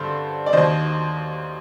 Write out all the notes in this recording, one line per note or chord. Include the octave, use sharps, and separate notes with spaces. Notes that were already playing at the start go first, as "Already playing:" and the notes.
Already playing: G2 D3 A4 C5
D5
D#2 D#3 C5 D#5